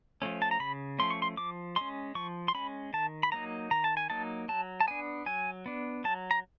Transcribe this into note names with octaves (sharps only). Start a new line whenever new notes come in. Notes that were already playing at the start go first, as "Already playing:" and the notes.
F3 A3 C#4
A5
A#5
C#3 B5
F3 A3 C#4 C6
C#6
C6
F3 D6
G#3 C#4 C6
F3 C#6
C6
G#3 C#4 B5
D#3 A5
B5
F#3 A#3 D#4 A#5
D#3 A#5
A5
G#5
F#3 A#3 D#4 A5
F#3 A5
A5
B3 D4 G#5
F#3 G#5
B3 D4
F#3 A5
A#5